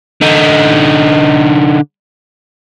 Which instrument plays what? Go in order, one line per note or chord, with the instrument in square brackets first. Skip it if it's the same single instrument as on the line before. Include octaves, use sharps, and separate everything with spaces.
[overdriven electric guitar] D3 D#4